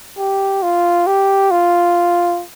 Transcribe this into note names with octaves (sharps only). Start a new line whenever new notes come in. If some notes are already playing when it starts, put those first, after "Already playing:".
G4
F4
G4
F4